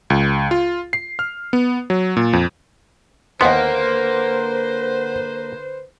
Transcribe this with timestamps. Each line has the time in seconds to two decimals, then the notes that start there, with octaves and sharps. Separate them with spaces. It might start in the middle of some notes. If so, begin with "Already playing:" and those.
0.10 C#2
0.51 F4
0.93 C7
1.19 F6
1.53 B3
1.90 F#3
2.17 A#2
2.33 F2
3.41 D#2 D3 A#3 B3 B4 C5 F#5 C6